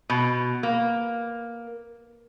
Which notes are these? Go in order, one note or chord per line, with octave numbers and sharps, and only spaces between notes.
B2
A#3